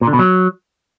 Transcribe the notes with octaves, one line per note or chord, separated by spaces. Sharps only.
A#2
D3
B2
F#3